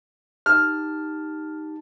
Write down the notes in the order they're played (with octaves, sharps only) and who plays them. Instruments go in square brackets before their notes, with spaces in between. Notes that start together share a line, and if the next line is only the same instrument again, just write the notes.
[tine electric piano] D#4 G4 A5 [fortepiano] F6